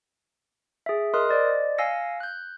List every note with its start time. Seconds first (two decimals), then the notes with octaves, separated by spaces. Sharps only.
0.86 G#4 E5
1.14 A#4 D#5 C6 D#6 F#6
1.29 C5 D5 D#5
1.78 F5 G#5 E6 A#6 C#7
2.20 F#6 G6